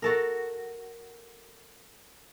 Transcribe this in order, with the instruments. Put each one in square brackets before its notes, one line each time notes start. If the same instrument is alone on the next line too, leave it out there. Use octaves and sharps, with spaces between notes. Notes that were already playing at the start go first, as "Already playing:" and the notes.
[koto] F#4 A4 A#4